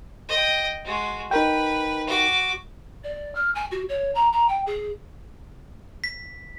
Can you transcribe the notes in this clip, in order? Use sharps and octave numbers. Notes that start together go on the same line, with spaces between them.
D#5 G5
G#3 F#4
D#4 A#4 B4 G5
F#4 D6
D5
F6
G#5
F#4
C#5
A#5
A#5
G5
G#4
B6